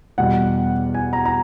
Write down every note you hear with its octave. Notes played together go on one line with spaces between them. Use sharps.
E2 B2 G3 F#5
G#5
A#5
A#5